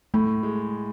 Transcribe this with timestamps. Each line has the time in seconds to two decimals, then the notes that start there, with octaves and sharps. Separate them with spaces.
0.14 A2 A3
0.43 G#3